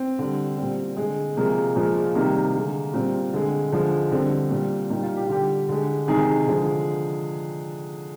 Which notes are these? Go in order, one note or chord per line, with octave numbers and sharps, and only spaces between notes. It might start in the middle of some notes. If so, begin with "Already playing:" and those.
Already playing: C4
D3 G3
A#2 G3 C4
D3 G#3
C3 F3 G#3 A#3
A#2 F3 G#3
C3 D#3 G3 A#3
D3 G#3
A#2 G3 C4
D3 G#3
D3 F3 G#3
D3 G3 C4
A#2 G3
A#2 G3 D#4
F4
G4
F4
D3 G3 G4
D3 G#3
C3 D#3 G#3 G#4
D3 F3 G#3